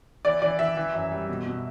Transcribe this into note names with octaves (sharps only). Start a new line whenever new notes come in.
E3 D5
E3 D5
E3 E5
E3
F#2
G3
B2
B2